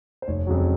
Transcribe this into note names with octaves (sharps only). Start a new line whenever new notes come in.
C5
F1 C#5
F2 C#3 F#3